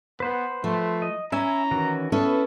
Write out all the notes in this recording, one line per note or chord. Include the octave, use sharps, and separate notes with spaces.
B3 B4 C5 F#5
F3 A3
D#5
C#4 E4 E5 G#5 A#5
D#3 E3 F#4
B3 C#4 E4 A4 B4